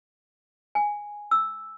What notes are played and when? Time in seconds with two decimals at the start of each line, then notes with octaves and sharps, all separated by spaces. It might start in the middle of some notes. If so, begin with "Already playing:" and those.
0.75 G#5
1.31 E6